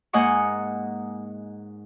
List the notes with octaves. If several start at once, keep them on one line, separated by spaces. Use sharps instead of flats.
G#2 A#3 D#5 F#5 G#5 C#6